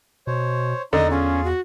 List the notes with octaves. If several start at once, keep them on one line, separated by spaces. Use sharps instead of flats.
B2 C5 C#5
E2 D3 D#4 D#5
C#4 F4 G#4
F#4